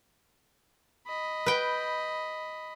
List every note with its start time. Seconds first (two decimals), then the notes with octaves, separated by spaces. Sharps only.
1.07 D#5 B5
1.46 B4 G5